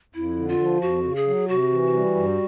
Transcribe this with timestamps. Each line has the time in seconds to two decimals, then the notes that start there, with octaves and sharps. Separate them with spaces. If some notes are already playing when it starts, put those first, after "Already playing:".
0.14 F2 E4
0.37 D3
0.48 F4
0.59 F3
0.81 F2 F#4
1.03 C#3
1.16 G#4
1.27 F#3
1.48 C3 F#4
1.71 E3
1.93 G3
2.15 G2